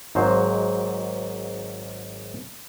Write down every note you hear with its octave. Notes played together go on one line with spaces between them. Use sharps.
G#1 G#2 F#3 C5